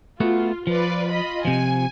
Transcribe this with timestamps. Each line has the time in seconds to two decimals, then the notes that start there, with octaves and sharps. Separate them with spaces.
0.20 A3 B3 F4 F#4
0.67 F3 F4 B4 D5
1.11 F4 D#5 B5
1.45 C3 F3 G#5